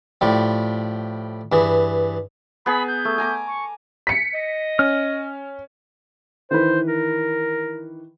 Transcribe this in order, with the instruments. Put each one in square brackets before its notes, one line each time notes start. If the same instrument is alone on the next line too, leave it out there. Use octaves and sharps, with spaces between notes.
[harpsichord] A2 F3 G3
G2 E3 G#4
[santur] B3 G#4 A#5 [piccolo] B5
[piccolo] G6
[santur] A3
G#5 A#5 D6
[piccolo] C#6
[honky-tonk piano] B6 C#7
[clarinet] D#5
[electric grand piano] C#4 [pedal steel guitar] F6
[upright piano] D#3 E3 B4 [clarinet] C5
[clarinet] A#4